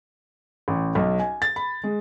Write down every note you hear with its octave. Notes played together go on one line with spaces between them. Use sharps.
A1
B1
G#5
A6
B5
G#3